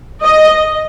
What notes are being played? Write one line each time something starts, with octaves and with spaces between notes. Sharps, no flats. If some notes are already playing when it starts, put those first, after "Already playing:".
D#5